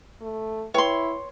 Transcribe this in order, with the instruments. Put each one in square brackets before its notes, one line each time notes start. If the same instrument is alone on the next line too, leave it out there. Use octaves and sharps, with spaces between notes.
[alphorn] A3
[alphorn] E4 [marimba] B4 G5 C#6 [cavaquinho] C#5 C6